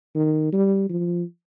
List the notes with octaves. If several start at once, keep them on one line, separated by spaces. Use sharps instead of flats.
D#3
G3
F3